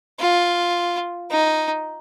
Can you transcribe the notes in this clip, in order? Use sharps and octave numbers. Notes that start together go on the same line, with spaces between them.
F4
D#4